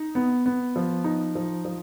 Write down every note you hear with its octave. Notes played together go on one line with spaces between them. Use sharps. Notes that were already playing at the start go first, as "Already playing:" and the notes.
Already playing: D#4
B3
B3
F3
D#4
F3
F3